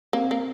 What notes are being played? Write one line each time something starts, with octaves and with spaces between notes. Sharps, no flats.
A#3 C4
A#3